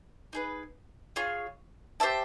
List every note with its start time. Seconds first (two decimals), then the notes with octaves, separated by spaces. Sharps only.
0.33 D#4 G#4 B4
1.16 F4 G#4 C#5
2.00 G4 C5 E5 A5